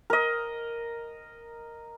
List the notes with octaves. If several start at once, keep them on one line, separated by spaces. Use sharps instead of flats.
A#4 D#5